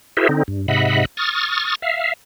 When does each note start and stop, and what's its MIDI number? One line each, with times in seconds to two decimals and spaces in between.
0.17 0.28 64
0.17 0.28 66
0.17 0.28 68
0.17 0.28 70
0.17 0.28 72
0.17 0.28 76
0.29 0.43 50
0.29 0.43 60
0.29 0.43 63
0.48 0.67 43
0.68 1.05 44
0.68 1.05 48
0.68 1.05 75
0.68 1.05 76
0.68 1.05 78
0.68 1.05 83
1.17 1.75 85
1.17 1.75 87
1.17 1.75 89
1.17 1.75 93
1.82 2.13 76
1.82 2.13 77